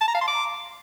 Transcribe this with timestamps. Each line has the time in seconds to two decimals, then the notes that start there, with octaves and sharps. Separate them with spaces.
0.01 A5
0.08 A#5
0.15 F5
0.21 C6
0.28 D6